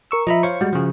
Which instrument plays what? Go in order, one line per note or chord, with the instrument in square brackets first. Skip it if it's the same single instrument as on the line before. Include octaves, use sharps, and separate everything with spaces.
[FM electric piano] A#4 C#6 E6
[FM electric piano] F3 E5 [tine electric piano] D#5 A#5 B5
[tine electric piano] C5 C#5 F5 [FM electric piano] C#6
[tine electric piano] G3 G#3 [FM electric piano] F#4
[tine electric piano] C#3 F3